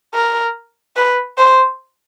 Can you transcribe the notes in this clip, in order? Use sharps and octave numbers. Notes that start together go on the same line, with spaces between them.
A#4
B4
C5